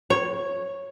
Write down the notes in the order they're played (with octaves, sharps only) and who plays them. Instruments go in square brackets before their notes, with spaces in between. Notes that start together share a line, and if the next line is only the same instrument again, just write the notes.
[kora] C#5